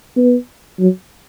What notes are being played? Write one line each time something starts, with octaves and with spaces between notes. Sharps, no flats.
B3
F#3